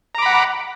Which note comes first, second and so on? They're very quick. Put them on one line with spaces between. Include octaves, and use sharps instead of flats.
A#5 D6 B5 F#5